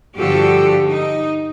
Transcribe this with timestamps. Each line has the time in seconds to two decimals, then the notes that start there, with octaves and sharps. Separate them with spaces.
0.16 G2 D3 F3 F#4 G4 A4
0.88 D#4